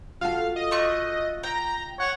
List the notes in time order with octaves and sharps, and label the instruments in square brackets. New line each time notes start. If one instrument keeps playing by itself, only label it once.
[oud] F4 F#4 A4 [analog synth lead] F5
[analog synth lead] D#5
[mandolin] A3 C#6 F#6
[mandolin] G5 [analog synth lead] A#5
[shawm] C#5 [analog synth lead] F#5